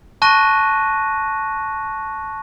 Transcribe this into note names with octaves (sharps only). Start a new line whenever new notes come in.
A5 C#6 F#6 A#6 D#7